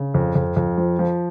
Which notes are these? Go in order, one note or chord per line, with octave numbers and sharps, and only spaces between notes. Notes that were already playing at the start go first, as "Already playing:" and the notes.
Already playing: C#3
F2
F2
F2
F3
F3